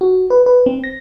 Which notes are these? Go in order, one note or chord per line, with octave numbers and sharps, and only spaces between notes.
F#4
B4
B4
C4
A#6